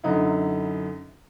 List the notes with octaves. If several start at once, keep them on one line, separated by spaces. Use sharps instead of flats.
F#2 D3 F#3 D#4 E4